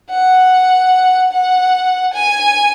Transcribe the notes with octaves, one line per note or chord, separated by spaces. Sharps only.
F#5
F#5
G#5